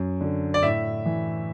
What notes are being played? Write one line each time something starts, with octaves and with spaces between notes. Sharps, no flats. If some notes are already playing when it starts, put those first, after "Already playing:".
Already playing: F#2
D3
D5
A2 E5
E3